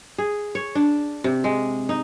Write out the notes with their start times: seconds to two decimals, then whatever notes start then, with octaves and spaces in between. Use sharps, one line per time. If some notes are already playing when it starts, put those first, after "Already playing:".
0.18 G#4
0.55 C#5
0.75 D4
1.24 C3
1.44 G#3
1.89 D#4